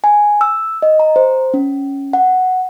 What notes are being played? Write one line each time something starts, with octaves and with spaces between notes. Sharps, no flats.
G#5
E6
D#5
A#5
C5
C#4
F#5